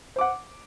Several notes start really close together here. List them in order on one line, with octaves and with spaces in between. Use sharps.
C5 D6 F#5